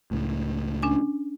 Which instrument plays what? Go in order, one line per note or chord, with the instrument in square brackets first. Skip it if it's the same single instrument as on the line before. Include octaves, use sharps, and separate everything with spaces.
[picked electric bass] C#2 A2
[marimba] C#4 D4 G#5